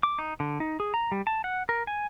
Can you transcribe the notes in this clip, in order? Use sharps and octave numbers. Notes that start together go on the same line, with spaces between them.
D6
D#4
D3
D#4
G#4
A#5
G3
A5
F#5
A#4
G#5